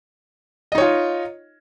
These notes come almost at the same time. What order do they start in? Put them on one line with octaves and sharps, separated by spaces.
D#5 D#4 C#5 F4